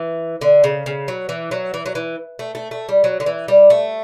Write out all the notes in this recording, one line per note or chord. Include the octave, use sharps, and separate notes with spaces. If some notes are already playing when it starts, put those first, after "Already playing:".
Already playing: E3
D3
C#3
C#3
F#3
E3
F#3
E3
F#3
E3
A3
A3
A3
G3
F#3
D3
E3
G3
A3